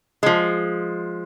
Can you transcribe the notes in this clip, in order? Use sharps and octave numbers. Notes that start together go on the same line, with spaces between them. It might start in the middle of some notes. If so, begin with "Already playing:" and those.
F3 G#3